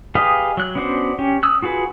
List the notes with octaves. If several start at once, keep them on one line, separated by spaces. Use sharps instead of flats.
G4 G#4 B4 D#5 F5
F#3 F#6
B3 C#4 D4 F#4 C5
C#4 G4
D#6 E6 F#6
F4 F#4 G#4 B4